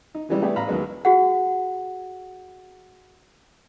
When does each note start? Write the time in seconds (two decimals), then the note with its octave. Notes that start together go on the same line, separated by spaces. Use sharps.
0.15 D#4
0.29 C#3 E3 G3 G#3
0.42 A3 B3 E4 G4 G#4 D5
0.56 A1 F5 A#5 B5
0.68 D#2 D#3 F#3 G#3 B3
1.05 F#4 G#4 F#5